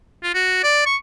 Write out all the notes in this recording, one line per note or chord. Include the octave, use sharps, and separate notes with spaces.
F4
F#4
D5
C#6